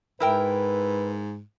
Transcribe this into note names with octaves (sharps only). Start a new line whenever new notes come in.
G#2 E4 A#4 B4 G5